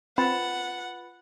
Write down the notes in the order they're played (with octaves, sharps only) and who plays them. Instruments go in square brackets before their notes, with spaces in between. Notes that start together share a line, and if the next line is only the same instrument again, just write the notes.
[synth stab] C4 [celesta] F4 B4 A6 [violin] F#5 [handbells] B5